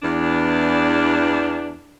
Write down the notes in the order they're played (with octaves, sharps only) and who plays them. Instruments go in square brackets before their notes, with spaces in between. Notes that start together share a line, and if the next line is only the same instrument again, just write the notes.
[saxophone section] E2 D4